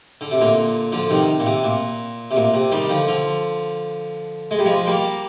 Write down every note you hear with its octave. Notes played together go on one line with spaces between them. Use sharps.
D3
C3
A#2 D3
D3 F3
C3 D#3
A#2
C3
A#2
C3
A#2
C3
D#3 G3
D3 F3
D3 F3
G#3
G3
F3 G#3
G3 A#3